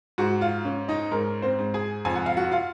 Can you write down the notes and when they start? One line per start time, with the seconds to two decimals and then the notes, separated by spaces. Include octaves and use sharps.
0.18 G#2 F#4 F#5
0.41 F4 F5
0.65 C#4
0.88 D#4 D#5
1.11 G#2 A#4
1.42 C4 C5
1.59 G#2
1.74 G#4 G#5
2.05 F2 G#5
2.15 F#5
2.26 F5
2.37 F#4 F#5
2.52 F4 F5